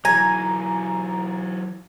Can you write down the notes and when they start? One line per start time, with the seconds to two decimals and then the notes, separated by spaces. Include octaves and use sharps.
0.05 E3 F#3 G#5 A#5